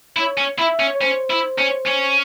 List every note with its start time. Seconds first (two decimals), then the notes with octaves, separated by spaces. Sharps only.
0.16 E4 C#5
0.38 C#4
0.59 E4 E5
0.80 C#4
0.94 C#5
1.01 C#4 C5
1.30 E4
1.59 C#4
1.87 C#4